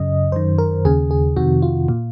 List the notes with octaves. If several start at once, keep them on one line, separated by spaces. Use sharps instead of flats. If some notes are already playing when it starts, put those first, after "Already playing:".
Already playing: F#2 C#3 D#5
F#2 D#3 C5
A#4
D#2 C#3 G#4
G#4
F2 C3 D#3 F#4
F4
A#2